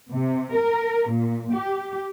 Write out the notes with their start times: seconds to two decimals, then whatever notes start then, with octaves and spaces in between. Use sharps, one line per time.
0.13 C3
0.55 A#4
1.13 A#2
1.54 G4